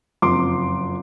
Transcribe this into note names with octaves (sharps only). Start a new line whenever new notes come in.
F#1 F2 C6 D6